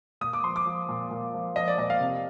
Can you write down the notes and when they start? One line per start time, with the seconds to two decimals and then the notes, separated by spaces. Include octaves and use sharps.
0.21 A#2 D#6
0.33 D6
0.44 F3 C6
0.56 D6
0.66 F3
0.89 A#2
1.11 A#2
1.34 F3
1.56 F3 D#5
1.68 D5
1.78 A#2 D#5
1.90 F5
2.00 C3